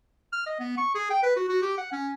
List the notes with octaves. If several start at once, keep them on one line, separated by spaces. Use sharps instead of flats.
F6
D#5
B3
C#6
G#4
G5
B4
F#4
F#4
G4
F#5
C#4